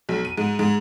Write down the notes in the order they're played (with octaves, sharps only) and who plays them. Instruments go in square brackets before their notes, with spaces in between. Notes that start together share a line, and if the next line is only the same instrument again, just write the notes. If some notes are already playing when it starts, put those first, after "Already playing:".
[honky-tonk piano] B1
D#7
G#2
G#2